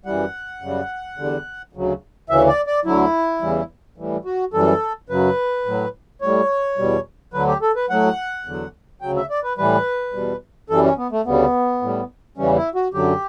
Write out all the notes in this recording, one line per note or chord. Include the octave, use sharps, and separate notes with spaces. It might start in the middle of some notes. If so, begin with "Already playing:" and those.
F#2 E3 G3 F#5
F#2 C#3 G3
E2 D3 G3
D2 C#3 F#3
D2 C#3 E3 E5
D5
D5
D2 D3 F#3 E4
E2 C#3 E3 G3
A2 E3 G3
F#4
F#2 E3 G3 A4
F#2 C#3 F#3 B4
A2 F#3
A2 G3 C#5
E2 B2 G3
D2 D3 F#3 B4
G4
A4
B4
A2 F#3 F#5
E2 D3 F#3
D2 C#3 F#3 G5
E5
D5
B4
A2 E3 G3 B4
E2 B2 G3
F#2 E3 G3 A4
C#4
B3
A3
D2 C#3 G3 B3
A2 G3
E2 C#3 E3 G3 C#4
E4
F#4
F#2 D3 F#3 G4